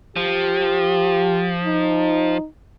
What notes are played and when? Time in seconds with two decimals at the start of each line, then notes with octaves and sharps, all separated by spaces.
0.16 F3 G4
1.64 D#4